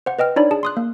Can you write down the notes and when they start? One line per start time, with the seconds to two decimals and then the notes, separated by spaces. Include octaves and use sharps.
0.06 C5 F#5
0.19 B4 D#5 G5 F6
0.36 D4 D#4 C#5 D5 B5
0.51 G#4 A5
0.63 C6 D#6 F#6
0.77 A#3